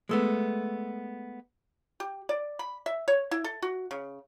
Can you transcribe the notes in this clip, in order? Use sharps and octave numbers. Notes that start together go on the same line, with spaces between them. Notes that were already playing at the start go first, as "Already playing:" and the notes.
G#3 A3 B3
G4
D5
B5
E5
C#5
E4
A4
F#4
C#3